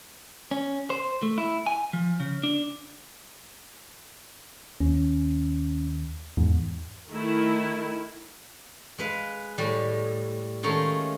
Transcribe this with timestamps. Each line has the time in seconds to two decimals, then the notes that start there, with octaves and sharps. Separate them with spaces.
0.51 C#4
0.90 C5
1.23 A3
1.38 E4
1.66 G#5
1.93 F3
2.20 C#3
2.43 D4
4.80 D#2 C#4
6.37 E2 G#2
7.09 D#3 A3 E4
8.98 G#3 B4 F5
9.58 A2 G3
10.63 D#3 G#3 A3 C#4 D#4 F4